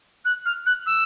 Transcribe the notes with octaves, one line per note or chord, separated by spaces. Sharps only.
F#6
F6
F#6
E6